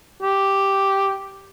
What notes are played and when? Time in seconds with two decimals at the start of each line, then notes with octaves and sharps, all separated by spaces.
0.22 G4